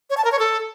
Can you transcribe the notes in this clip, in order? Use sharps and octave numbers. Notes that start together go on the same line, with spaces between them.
C#5
A5
A#4
C#5
A4